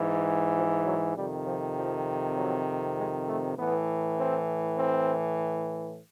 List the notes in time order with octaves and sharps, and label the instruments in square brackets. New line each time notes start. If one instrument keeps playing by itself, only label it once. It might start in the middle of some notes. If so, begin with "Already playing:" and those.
Already playing: [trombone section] G#2 E3
F3
F#3
F2 C3 D#3 G3
F3
F3
F#3
G#3
A3
A2 E3 B3
C4
C4